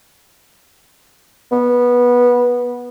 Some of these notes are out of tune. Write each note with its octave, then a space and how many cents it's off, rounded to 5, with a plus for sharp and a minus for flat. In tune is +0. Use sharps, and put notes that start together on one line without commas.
B3 -15